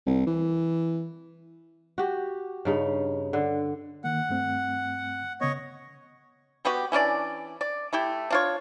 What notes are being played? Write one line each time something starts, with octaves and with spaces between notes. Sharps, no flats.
C2
E3
F#4 G4
G2 C#3 D#4
D3
D#3 A#3 F#5
G2 A3 C4
C#3 B3 C#5 D#5 C#6
G3 B3 F#4 G4
E3 C#4 D4 D5
D5
A3 E4 G4
D4 F4 C#5